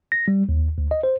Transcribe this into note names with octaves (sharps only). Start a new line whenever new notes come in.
A#6
G3
D#2
D2
D#5
C5